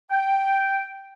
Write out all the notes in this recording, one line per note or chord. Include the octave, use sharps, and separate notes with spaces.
G5